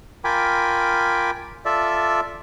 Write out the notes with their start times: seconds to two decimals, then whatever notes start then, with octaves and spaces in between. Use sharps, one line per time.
0.24 F4 A#4 G5 G#5 B5 D6
1.65 F4 A4 D5 E5